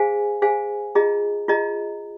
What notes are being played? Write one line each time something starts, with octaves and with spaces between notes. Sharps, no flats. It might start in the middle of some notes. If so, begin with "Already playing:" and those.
Already playing: G#4 C5 F5 G#5
G#4 C5 F5 G#5
F4 G#4 D#5 A#5
F4 G#4 D#5 A#5